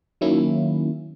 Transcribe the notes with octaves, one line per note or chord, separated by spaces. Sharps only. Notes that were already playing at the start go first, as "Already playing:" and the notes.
D#3 F#3 A#3 C#4 E4